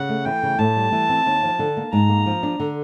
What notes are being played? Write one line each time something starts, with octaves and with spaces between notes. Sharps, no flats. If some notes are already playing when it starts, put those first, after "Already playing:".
Already playing: C#3 F#5
A3
E3 G5
C#3
A2 A5
G3
E3
C4
D#2
F3
D3
A#3
G#2 A#5
A#3
F3
D4
D3